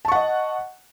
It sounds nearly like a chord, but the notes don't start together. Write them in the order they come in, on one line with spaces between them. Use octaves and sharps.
A5 C#6 F#5 D#5